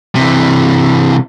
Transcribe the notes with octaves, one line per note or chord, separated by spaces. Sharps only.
C3 E3